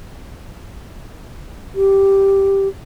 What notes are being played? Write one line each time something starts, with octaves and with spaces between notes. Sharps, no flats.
G4